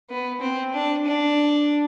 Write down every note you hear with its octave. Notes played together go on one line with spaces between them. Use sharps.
B3
C4
D4
D4